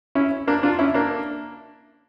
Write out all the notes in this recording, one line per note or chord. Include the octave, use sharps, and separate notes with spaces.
C#4 E4
A#3 D4
D4 F4
C#4 E4
A#3 D4